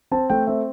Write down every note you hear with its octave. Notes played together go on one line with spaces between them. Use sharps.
C4 A5
A3 G5
C4 E5